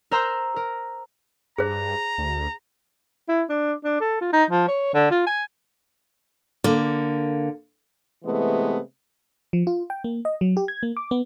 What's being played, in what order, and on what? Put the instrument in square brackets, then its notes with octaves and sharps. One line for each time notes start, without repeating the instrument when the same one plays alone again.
[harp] A#4 C5 A#5 C6 E6 G6
A#4
[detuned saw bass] G2 [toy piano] G#4 C5 [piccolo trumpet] A#5
[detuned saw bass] D2
[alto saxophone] E4
D4
D4
A4
F4
D#4
F3
C#5
D3
F4
G#5
[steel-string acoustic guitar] D3 A#3
[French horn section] C3 E3 G#3 A3 B3
[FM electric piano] F3
F4
G5
A#3
D#5
F#3
G4
G#6
A#3
D6
B3